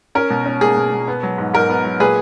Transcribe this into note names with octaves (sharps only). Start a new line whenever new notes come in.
C#4 A#4
B2
C#4
A#3 G#4
B2
B2
B3
F#3
G#2
G#2 A#4
B3
F#3
A#2 G#4 B4